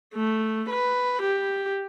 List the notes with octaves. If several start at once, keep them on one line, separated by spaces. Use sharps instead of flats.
A3
B4
G4